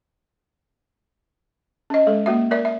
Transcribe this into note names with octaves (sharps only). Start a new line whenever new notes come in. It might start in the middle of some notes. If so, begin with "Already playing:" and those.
C#4 D#5
G#3 A4
A#3 F#4 E5
A#4 D5 E5
E5